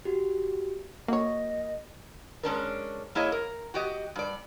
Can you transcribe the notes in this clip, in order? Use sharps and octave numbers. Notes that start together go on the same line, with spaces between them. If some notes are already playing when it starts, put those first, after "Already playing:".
F#4 G4
A#3 F#4 C#5 D#5
G#3 C#4 D4 A#4
A#3 E4 G#4 C#5 D#5
A#4
F#4 G4 D#5
G2 D5